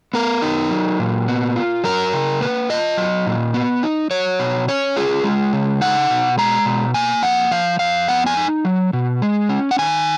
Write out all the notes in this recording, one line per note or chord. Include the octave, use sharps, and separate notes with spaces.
B3 A#4
D#4
F#3
A#2
B3
F4
F#3 A#4
C#3
A#3 B4
F4 D#5
F#3
A#2
B3
D#4
F#3 C#5
B2
C#4 C#5
F4 G#4
G#3
C#3
D#4 F#5
B2
G#3 A#5
B2
A#3 G#5
F2 F#5
F3 F5
F2 F5
B3 F#5
G#5
D#4
F#3
B2
G#3
C#4
F#5
D#3 G#5